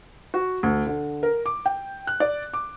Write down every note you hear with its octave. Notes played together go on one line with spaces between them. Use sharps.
F#4
D2
D3
A#4
D6
G5
F#6
D5
D6